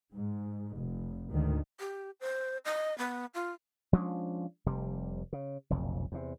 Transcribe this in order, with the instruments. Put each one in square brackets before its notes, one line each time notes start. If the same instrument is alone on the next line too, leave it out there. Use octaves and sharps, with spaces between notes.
[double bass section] G#2
F1
D2 G#2 D#3
[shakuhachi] G4
C5
D#5
B3
F4
[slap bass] F3 G#3 C#4 D4
F1 C3 G3
C#3
F1 B1 F2 C#3
E2 C3